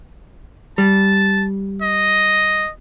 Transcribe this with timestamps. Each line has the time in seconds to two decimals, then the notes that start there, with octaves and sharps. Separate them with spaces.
0.78 G3 A5
1.82 D#5